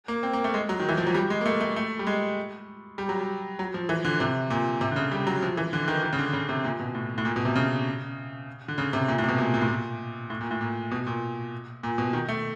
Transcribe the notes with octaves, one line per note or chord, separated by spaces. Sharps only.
A#3
C4
A#3
A3
G#3
F#3
D#3
E3
F3
F#3
G3
G#3
A#3
A3
A3
A3
G3
G#3
G3
F#3
G3
F#3
F3
E3
D3
C3
A#2
C3
D3
C#3
G3
F#3
F3
E3
D3
D#3
D#3
C#3
D3
C#3
C3
A#2
B2
A2
A2
A#2
B2
C3
C#3
D3
C#3
C3
A#2
A2
C3
B2
A#2
A#2
A2
A#2
A2
A#2
A2
A#2
B2
A#2
A#2
B2
D#3
A3